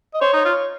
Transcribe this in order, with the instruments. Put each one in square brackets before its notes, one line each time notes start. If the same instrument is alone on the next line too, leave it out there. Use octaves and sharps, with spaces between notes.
[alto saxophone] D#5
[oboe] C5 [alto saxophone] C#5
[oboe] D#4
[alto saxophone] C#5
[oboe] F4
[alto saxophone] C#5